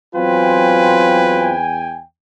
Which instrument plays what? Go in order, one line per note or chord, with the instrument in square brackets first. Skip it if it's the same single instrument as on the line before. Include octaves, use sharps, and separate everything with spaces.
[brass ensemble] E2 G5 G#5 [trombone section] F#3 C4 F4 [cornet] B4